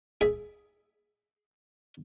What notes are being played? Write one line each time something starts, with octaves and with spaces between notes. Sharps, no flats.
G#4 E5